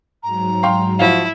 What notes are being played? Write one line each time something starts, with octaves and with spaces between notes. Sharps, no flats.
G#2 F#3 A#5
F5 G5 C6
F3 E4 F#4 F5